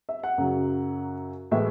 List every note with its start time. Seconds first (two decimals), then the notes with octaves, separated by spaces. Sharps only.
0.09 E5
0.23 F#5
0.38 F#2 C#3 F#3
1.51 A2 E3 G#3 E5